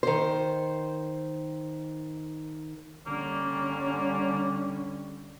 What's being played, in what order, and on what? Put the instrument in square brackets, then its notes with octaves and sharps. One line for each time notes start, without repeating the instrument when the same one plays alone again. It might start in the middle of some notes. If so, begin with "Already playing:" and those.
[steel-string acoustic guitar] D#3 C5
[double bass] D3 C#4 [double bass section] G3 [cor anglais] A#3